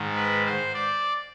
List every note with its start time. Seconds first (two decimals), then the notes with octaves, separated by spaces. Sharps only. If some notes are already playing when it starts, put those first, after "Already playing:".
Already playing: G#2 D#3 G#3
0.16 B4
0.46 C5
0.74 D5